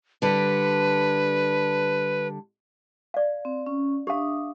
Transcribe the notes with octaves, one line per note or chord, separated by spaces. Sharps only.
D3 G3 B4
D5 F5
C4
C#4
D4 G4 E5 F5 D#6